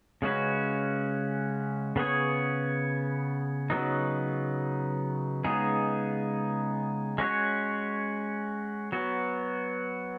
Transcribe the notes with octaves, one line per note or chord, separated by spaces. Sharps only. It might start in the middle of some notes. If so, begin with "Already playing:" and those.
C#3 G#3 C#4 F#4 B4
C#3 B3 G#4 C#5
C#3 F#3 B3 D#4
C#3 G#3 B3 D#4 G#4
G#3 C#4 F#4 C#5
F#3 B3 F#4